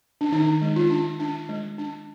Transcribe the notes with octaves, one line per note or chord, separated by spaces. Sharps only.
D4
D#3 D#4
G#3
F4
D4
D4
G#3
D4